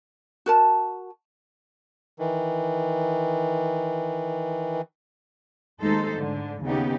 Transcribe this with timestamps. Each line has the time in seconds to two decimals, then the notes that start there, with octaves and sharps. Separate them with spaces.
0.46 F#4 A#4 A5
2.19 D#3 E3
5.79 D#2 G#3 A3 D#4 A4 C5
6.16 G#2 D3
6.64 D#2 C#3 B3 C#4 D#4 G4